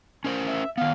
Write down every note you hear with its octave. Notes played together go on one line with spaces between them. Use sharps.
C#4 A#4 C5
E5
D#3 B3 F5